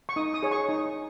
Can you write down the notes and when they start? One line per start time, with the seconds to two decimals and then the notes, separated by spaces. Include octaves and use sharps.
0.09 C#6
0.16 D#4 D#6
0.34 D#6
0.43 G#4 C#5
0.51 C#6
0.69 D#4